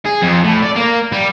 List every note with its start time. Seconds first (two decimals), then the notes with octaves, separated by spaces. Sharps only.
0.05 G#4
0.22 F2
0.44 A2
0.62 D5
0.76 A#3
1.12 G3